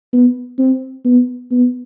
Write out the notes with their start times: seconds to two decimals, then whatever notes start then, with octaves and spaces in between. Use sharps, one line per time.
0.13 B3
0.58 C4
1.05 B3
1.51 B3